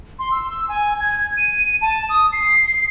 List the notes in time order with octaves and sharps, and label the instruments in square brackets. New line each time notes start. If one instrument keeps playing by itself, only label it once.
[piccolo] C6
E6
G#5
G#6
D#7
A5
D#6
C7